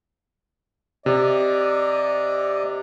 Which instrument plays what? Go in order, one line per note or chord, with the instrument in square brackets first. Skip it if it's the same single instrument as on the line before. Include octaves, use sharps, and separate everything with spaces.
[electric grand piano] C3 [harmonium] D5 D#5